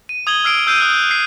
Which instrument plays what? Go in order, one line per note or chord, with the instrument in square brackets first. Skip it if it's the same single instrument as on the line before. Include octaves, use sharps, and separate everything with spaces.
[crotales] D#7
D#6 G#6 F#7 G7
E6 F6 C7 D7
E6 F6 G6 C7 D7 D#7
D#6 F#6
C7